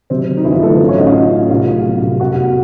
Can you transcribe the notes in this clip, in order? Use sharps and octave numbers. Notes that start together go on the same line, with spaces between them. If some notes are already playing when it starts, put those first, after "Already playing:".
C3 F#3 C4
D3
D#3 D#4
G1 E3 E4
F3 F4
F#3 A3 A4
A1
C#4 C#5
A1 D#4 D#5
F4 F5
A1
A2
C2 F4 F5
F#3
B2
C2
F1 F#4 F#5
E2